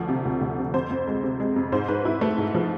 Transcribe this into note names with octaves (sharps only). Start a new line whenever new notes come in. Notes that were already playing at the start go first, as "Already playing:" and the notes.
Already playing: D2 F3
C3
D2
D2
C3
F2 C5
F2
G#3
C3
G#3
F2
G#2 C5
G#2 B4
G#2 E4
A3
G#2
F3